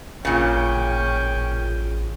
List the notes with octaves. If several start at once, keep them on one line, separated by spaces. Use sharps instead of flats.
A1 A#2 C#3 C#4 G5